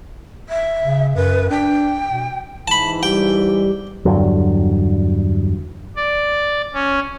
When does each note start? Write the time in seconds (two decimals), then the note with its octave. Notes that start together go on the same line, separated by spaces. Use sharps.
0.49 E5
0.85 C#3
1.16 F#2 B4
1.50 D4 G5
2.09 B2
2.68 G#2 E3 A5 B5
3.03 G3 G4 G5
4.05 E2 G2 D3 F#3
5.97 D5
6.73 C#4